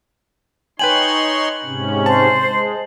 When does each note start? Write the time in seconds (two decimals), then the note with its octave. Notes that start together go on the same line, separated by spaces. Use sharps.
0.79 D#4 B4 C#5 G5 G#5 C6 F#7
1.64 G#2 C3 C#4
2.06 C5 A5
2.42 G#3